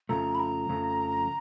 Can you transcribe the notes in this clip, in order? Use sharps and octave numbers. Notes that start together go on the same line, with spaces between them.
F2 C#3 F3 A3 A#5
B5
A#5
F2 C#3 F3 A3